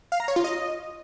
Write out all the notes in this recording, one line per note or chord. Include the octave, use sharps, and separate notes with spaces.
F5
A#5
C#5
F4
D#5